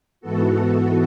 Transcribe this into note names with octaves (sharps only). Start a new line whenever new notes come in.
G#2 E3 B3 F#4 A4